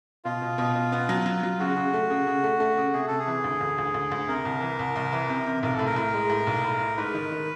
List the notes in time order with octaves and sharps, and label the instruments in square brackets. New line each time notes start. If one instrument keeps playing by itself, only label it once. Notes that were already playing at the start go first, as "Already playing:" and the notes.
[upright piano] B2 [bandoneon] F4
[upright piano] B2
B2
B2
B3
F#3
F#3
F#3
[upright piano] C#3 [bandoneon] F#4
[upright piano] C#3
A3
C#3
C#3
A3
A3
C#3
[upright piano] C3 [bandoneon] G#4
[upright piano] C3 [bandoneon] A4
[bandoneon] G#4
[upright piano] E3
D2
D2
D2
D2
D2
[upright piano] C3 [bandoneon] A#4
[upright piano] C2
E3
C2
C2
E3
C3
C3
[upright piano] B1 [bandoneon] A#4
[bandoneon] A4
[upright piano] A2
[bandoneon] A#4
[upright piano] A2
G#3
A2
B1
A2
A2
[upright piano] G#2 [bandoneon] B4
[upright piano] D#3
D#3